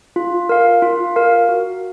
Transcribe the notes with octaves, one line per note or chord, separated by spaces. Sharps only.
F4
A#4 F5
F4
A#4 F5
F#4